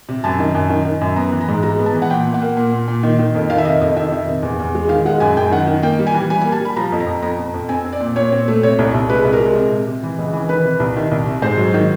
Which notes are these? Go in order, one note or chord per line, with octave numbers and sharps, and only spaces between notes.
C3
F#2 A5
D#3
F#2
D#3
D#3
F#2
B3 A#5
E3
A#5
G#2
G#3 A#5
B3
A5
E3
F#5
A#2 G5
A#2
F#5
A#3
A#2
A#2
A#2
D#3
D#3
F2
D#3 F5
E5
C3 D#5
F2 D#5
D#3 E5
D#3
C3
E2
E2
G#3
D#3 F5
G#3 F#5
F#2 G#5
F#2 G5
D#3 F#5
D#3
A#3 G5
G3
G#5
E3
G3 G#5
G#5
A#3
A5
G3
B5
F3 A#5
F2
A#5
F2
F2 A#5
F2
F2
C4 G#5
C4
D5
A#2
A#2 C#5
C4
A3
C3 C#5
C2
C2
G#3 B4
C2
A#4
G#3
C3
C3
C3
E3
C#2
E3
D#3 B4
C3
C2
D#3
C2
C3
G#2 C5
F#3
D#3